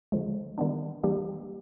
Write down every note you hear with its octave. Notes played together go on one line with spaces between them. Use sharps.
D3 F3 G#3
D#3 G3 B3 D4
E3 G3 A#3 D4 G4